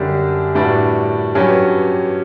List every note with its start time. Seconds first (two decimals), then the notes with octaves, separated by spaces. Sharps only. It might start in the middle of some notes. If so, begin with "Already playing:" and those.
Already playing: F#2 D3 G3 D4 G4
0.55 A2 G3 D4 F#4 B4
1.35 G2 F#3 C#4 G4 B4